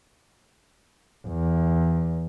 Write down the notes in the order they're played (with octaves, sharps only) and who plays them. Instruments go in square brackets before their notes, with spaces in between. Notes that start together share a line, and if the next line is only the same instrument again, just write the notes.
[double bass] E2